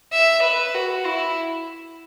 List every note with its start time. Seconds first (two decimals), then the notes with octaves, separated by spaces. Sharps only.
0.13 E5
0.43 B4
0.75 F#4
1.06 E4